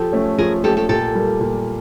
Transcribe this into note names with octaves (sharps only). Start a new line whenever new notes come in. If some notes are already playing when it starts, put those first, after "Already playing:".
Already playing: F3 G4 A4
A3 C#4
F3 G#4 A#4
A3 C#4 G4 A4
G4 A4
A#2 G4 A4
G3 A#3
A#2